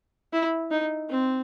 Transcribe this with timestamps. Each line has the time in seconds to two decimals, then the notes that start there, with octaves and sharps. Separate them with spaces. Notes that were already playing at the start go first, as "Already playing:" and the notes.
0.33 E4
0.71 D#4
1.10 C4